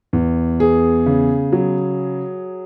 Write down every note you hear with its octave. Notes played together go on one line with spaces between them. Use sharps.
E2
B3 G#4
C#3
F#3